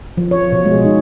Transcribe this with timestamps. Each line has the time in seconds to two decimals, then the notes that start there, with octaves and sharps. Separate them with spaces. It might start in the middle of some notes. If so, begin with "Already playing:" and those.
0.17 F3
0.31 C#5
0.52 B2
0.65 G#3
0.85 D#4